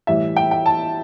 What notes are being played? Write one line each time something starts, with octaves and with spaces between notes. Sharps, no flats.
A2 E3 G3 E5
G5
G5
A5